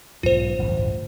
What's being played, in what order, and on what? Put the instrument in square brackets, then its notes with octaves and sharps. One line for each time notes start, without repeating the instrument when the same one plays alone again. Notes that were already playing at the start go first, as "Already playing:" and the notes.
[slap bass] B1 G#2 [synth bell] F4 C5
[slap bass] D1 A1 G2